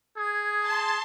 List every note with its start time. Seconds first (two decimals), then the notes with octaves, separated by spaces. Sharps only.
0.17 G#4 D#6 G#6
0.60 A5 C6